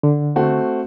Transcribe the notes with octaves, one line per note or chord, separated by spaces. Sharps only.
D3
A3 C4 F#4